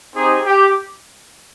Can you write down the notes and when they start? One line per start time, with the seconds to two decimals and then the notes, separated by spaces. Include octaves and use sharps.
0.15 C4 D#4 G4 G#4
0.45 G4